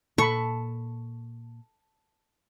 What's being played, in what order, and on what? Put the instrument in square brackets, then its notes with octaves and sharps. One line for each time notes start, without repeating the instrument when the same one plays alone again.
[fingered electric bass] A#2 [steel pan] A4 B5 [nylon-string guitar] A5 [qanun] C#6